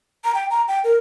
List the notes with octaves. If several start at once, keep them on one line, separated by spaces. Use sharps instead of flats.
A#5
G5
A#5
G5
A#4